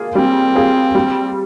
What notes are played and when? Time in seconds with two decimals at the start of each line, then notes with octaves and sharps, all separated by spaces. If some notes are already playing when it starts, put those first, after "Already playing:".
Already playing: A#3 F4 G#4
0.15 G3 C4
0.55 A#3 F4 G#4
0.95 G3